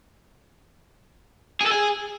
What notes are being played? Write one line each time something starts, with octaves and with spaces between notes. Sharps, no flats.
G#4
A4
G#4